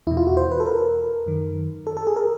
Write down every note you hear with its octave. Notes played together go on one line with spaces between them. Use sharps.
E2 B2 E4
F4
F#4
C5
B4
A4
A#4
F#2 D#3
A4
A4
G#4
A#4